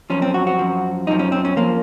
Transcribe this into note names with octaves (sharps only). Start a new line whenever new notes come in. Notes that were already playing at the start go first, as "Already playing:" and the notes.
F#2 F3 C#4
C4
F#4
F#4
F#2 F3
F#2 F3 D#4
C#4
C4
C#4
F3 A#3